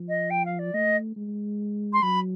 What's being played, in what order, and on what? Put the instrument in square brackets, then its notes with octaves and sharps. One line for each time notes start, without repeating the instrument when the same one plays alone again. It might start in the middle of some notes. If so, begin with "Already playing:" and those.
Already playing: [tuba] F3
[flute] D#5
G5
F5
D5
[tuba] A3 [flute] D#5
[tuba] G#3
[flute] C6
[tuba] F#3 [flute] B5